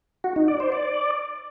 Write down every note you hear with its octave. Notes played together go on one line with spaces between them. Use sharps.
F#4
D#4
D5
C5
D5